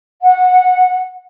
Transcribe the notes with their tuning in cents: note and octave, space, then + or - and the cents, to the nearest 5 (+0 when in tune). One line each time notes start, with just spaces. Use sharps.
F#5 -20